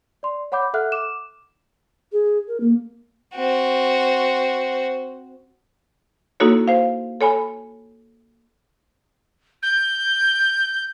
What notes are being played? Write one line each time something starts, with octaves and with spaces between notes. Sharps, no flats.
D5 C6
C#5 F#5 B5 D6 G6
A4 E5 F#5 F6 F#6
D6 E7
G#4
A#4
A#3
C4 F#4
A#3 D#4 E4 F#4 A4 C#5
C5 F5
A4 C#5 G#5 B5
G6